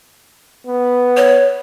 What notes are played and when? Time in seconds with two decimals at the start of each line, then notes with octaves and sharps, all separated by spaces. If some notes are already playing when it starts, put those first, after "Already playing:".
0.67 B3
1.17 C#5